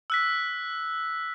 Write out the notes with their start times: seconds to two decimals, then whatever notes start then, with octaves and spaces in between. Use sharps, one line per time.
0.10 E6 F#6 B6